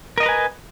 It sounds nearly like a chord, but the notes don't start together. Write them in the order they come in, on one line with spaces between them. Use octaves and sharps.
A#4 D#5 A#5 B4 G#5